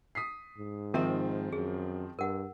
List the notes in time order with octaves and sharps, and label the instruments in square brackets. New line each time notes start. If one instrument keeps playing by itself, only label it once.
[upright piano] D#6 B6 C7
[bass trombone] G#2
[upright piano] D#3 F3 C4 [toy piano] A#4 E5 A#5
[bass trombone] F#2 [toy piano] G#4
[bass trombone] G2 [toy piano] A#4 F#5